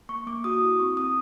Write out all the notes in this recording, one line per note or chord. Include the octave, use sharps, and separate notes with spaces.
A#3 C#6
A#3 D6
F#4 D#6
E4
C4 C#6
C4 D#6